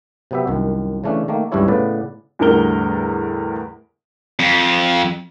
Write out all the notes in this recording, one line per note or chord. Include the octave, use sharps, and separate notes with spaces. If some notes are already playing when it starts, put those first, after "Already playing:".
C3 F#3 B3 G4 E5
C2 F#2 D#3
C#3 E3 A3 C#4 D4
D#3 A3 A#3
C#2 G2 G3 D4 E4 C#5
A2 C#3 B3 B4 D5
E2 A2 D3 G3 A#4 G7
F2